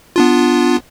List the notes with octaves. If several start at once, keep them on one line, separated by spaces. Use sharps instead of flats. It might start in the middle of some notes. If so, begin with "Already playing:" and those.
B3 D4 F4